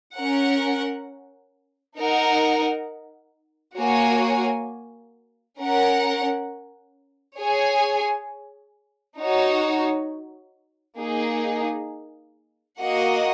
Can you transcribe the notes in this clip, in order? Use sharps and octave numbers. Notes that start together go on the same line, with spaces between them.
C#4 A#4 F#5
D#4 A#4 F#5
A#3 F#4 C#5 G#5
C#4 A#4 F#5
G#4 C#5 G#5
D#4 F#4 C#5
A#3 D#4 G#4
A#3 F#4 D#5 F#5